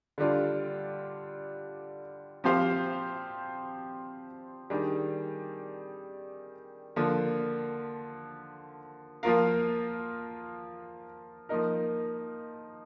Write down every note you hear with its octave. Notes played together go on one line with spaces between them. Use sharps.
D3 G3 D4 F4
F3 C4 G4 C5 F5
D#3 G3 D4 G#4
D3 F3 A#3
F3 A#3 F4 A#4 F5
F3 A#3 D#4 A#4